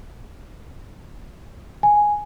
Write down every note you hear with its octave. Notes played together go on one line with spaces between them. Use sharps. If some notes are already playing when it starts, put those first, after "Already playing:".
G#5